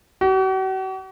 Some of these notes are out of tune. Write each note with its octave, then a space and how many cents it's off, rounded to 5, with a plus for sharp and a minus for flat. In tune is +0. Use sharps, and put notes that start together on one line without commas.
F#4 +45